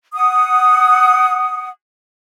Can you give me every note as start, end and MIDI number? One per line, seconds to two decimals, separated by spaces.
0.14 1.69 78
0.14 1.69 87